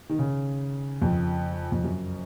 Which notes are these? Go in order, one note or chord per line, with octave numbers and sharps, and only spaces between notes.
D#3
C#3
F2
F2
F#2